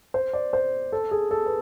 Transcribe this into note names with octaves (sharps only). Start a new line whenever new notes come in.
C5
D5
C5
A4
G#4
A4
B4